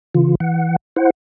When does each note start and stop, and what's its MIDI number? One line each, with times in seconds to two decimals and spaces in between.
0.15 0.35 49
0.15 0.35 52
0.15 0.35 65
0.40 0.76 52
0.40 0.76 78
0.96 1.10 64
0.96 1.10 72
0.96 1.10 78